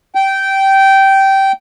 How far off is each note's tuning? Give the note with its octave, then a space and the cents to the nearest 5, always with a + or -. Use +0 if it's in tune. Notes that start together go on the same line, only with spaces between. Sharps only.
G5 -15